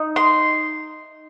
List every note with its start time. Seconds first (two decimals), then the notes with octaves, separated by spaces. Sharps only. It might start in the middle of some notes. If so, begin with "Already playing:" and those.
Already playing: D#4
0.16 C6